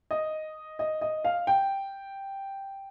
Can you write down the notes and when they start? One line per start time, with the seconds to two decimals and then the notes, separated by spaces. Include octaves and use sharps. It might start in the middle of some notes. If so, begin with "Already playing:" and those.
0.11 D#5
0.79 D#5
1.01 D#5
1.25 F5
1.47 G5